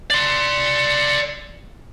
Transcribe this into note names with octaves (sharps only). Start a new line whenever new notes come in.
D5 C6